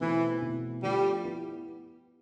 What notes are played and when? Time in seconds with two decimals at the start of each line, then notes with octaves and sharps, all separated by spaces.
0.01 B2 E3 A3 C4 E4
0.42 B2 A3 E4
0.83 F3 G3 A3 D4 F4
1.24 B3 E4